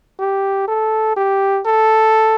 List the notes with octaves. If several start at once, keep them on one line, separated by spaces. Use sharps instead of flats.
G4
A4
G4
A4